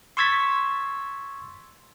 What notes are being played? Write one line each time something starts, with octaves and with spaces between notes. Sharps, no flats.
C6 C#6 E6 G#6 A6 B6